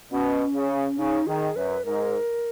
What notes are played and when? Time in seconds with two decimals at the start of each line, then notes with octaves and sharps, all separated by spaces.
0.11 B2 C#4
0.55 C#3
0.98 C#3 D#4
1.27 D#3 G#4
1.56 F#2 B4
1.85 G#2 A#4